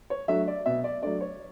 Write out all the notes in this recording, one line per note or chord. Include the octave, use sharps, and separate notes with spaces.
C#5
F#3 A3 D4 E5
D5
B2 E5
D5
F#3 A3 D4 D5
C#5